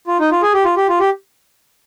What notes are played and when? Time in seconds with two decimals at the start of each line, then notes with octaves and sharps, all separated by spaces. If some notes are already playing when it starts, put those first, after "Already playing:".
0.07 F4
0.19 D#4
0.31 F4
0.42 G#4
0.54 G4
0.64 F4
0.77 G4
0.89 F4
1.00 G4